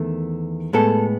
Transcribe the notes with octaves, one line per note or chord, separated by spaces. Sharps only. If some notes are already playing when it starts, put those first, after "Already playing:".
Already playing: E2 D#3 A3
A2 G#3 B3 A4